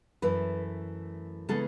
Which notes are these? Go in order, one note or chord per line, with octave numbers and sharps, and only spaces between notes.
F#2 E3 A3 B4
C#3 E3 G#3 B3 A4